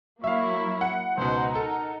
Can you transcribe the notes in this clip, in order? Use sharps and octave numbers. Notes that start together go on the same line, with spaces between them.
F#3 A#3 E4 E5 F5 C#6
F#5
C#2 B2 D#4 C5
A4 A#4